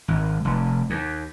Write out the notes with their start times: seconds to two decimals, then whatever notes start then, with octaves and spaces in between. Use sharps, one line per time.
0.08 G#1
0.45 F1
0.90 D#2